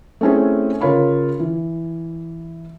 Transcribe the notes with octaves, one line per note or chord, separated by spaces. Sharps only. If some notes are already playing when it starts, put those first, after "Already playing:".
A3 C4 C#4 E4 G#4
C#3 F4 A#4 C#5 B5
E3